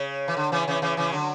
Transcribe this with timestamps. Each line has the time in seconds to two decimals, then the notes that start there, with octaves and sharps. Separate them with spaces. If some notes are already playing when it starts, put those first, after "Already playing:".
Already playing: C#3
0.28 E3
0.37 D3
0.52 C#3 E3
0.67 C#3 E3
0.82 C#3 E3
0.97 C#3 E3
1.12 D3 F#3